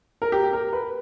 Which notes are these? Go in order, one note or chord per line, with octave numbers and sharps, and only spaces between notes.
A#4
G4
A#4
B4